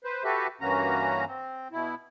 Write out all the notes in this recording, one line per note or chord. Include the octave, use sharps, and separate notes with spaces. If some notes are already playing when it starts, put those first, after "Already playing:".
B4 C5
F#4 G4 A4 B4 E5
G2 E3 A#3 C#4 F#4 A#5
C4
B2 E4